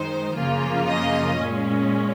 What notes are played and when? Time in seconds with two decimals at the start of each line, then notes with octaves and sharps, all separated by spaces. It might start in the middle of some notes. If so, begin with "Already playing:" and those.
Already playing: F#2 D#3 G#3 D#4 C5
0.36 F#2 C#3 F3 A#3 F4
0.87 D#5
1.37 A#2 G#3 C#4